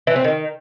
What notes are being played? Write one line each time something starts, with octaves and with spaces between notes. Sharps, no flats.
E3
C4
D#3